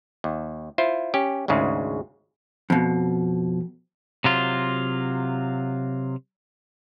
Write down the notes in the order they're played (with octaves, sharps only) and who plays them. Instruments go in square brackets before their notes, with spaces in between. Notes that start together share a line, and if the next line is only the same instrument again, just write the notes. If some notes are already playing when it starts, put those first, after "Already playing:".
[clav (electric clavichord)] D#2
E4 F4 C5
C#4 G4
G#1 D2 G#2 C#3 G#3
[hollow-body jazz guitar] F2 B2
[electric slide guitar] C3 F#3 F4